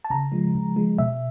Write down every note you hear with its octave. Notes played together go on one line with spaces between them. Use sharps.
A5
C#3 A#5
F3 G#3
C#3
F3 G#3
B2 E5